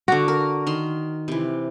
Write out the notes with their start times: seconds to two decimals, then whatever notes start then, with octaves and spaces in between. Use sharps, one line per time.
0.08 D3 F#4 F5 D6
0.28 A#4
0.67 D#3 C6
1.28 C3 E3